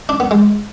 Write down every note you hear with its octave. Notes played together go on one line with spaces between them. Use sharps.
D4
B3
G#3